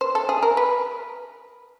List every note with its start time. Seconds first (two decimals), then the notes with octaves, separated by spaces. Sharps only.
0.01 C5
0.15 A4
0.29 G#4
0.43 A#4
0.57 B4